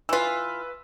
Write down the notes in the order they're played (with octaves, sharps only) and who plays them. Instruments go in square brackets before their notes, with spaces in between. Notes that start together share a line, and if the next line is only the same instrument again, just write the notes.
[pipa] E3 F4 [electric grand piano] B4 E6